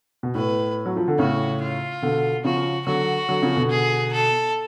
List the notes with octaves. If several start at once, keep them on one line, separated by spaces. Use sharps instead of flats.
B2
A2 B4
F#3
F3
D3
A2 C#3 F#4
F4
B2 D3
C#3 F3 F#4
D3 F#3 F#4
D3 F#3
C#3 F3
B2 D3
G#4
A4